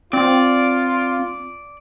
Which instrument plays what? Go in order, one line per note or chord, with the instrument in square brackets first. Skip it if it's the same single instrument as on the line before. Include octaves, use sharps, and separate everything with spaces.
[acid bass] C4 [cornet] F4 [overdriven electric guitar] D5